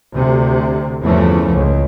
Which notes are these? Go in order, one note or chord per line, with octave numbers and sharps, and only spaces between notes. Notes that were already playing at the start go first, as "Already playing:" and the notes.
D2 C3
G1 E2 E3 F3 A3 C#4
C#2